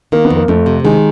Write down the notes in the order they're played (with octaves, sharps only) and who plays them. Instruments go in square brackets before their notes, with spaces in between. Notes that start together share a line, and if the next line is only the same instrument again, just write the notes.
[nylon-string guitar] D#3 [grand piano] A#3
[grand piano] B3
[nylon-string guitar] F2
[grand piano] A#3
[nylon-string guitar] F2 [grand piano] A3
[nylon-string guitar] C3
[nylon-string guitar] D#3 [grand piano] G#3